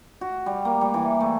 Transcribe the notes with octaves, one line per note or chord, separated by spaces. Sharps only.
F#4
G3
A#3
G3
E3
A3